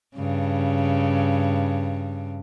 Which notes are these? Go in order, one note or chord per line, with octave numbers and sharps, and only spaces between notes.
G2 C#3